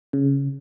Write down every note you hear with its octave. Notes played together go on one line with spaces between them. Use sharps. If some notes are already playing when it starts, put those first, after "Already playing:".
C#3